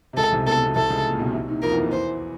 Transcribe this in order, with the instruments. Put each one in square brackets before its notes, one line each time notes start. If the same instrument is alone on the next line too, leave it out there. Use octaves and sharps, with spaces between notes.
[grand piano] C3
[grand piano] C#2 C#3 [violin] A4
[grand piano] C2 C3
[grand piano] B1 B2 [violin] A4
[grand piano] B2
[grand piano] C2 C3 [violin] A4
[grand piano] C#2 C#3
A#2
B1 B2
C2 C3
D#2 D#3
[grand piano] F2 F3 [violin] A#4
[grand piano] E2 E3
D#2 D#3
[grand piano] E2 E3 [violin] C5